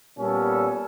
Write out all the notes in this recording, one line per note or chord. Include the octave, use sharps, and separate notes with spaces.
A#2 G3 B3 C#4 A4